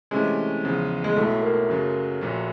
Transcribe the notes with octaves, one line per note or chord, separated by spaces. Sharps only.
C3 E3 G#3 A3 C#4
E2 C#3 F3
G#3
B1 A2 F#3 A3
A#3
F#2 C#3 F#3
A#1 A#2 F#3